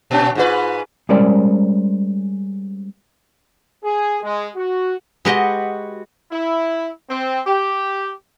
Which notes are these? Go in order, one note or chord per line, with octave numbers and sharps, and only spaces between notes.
A#2 C#4
G#2 F4 B4
G3 G#3 C#4 A#4 C5 D5
G#4
G#3
F#4
G#3 F#4 G4 B4 D#5
E4
C4
G4